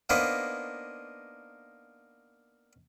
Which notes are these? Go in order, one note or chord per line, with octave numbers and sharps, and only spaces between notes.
A#3 B3 D4 D#4 B4 C5